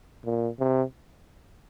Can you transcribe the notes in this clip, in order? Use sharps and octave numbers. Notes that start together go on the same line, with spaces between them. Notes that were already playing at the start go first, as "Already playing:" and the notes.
A#2
C3